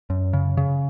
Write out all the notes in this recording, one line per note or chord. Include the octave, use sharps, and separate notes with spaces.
F#2
C#3
C#3